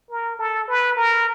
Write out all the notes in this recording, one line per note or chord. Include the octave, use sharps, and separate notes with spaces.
A#4
A4
B4
A#4